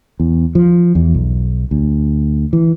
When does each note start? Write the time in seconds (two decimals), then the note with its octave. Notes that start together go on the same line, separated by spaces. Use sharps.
0.20 E2
0.55 F3
0.95 E2
1.14 B1
1.71 D2
2.53 E3